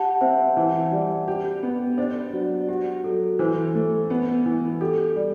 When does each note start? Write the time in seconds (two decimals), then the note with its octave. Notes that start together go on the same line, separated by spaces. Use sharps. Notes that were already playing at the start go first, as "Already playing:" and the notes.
Already playing: G4 F#5 A5
0.21 C4 C5 E5
0.57 E3
0.92 G3
1.28 G4
1.63 B3
1.98 D4 C5
2.33 F#3 F#4
2.68 F#4 G4
3.04 F#3 A4
3.39 E3 C5
3.75 A3
4.10 B3
4.46 E3
4.81 G4 A4
5.16 G3